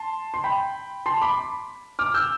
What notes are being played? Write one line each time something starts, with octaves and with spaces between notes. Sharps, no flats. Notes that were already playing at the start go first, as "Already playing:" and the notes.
Already playing: A5 C6
C6
G5 B5
A5 C6
B5 D6
D6 F6
E6 G6